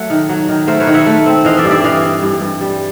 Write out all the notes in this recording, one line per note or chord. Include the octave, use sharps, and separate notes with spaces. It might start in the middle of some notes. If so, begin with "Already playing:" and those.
Already playing: F#3 A3 F#5
D#3
F#3
D#3
A3 A#4 C5
B4 C#5
D#3
E5 F#5
A3
C4
E3 D#5 F5
D5 E5
G2
D5 E5
E3 D#5 F5
E3
G2
G2
G3